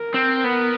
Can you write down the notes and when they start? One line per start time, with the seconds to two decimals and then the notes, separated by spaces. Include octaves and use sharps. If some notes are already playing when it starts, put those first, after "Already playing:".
Already playing: A#4
0.14 C4
0.44 B3